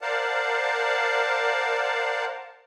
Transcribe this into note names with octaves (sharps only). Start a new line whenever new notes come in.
A#4 C5 D5 F5 F#5 A5